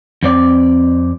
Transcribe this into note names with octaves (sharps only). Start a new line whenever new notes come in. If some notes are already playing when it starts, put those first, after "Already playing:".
F2 C4 D5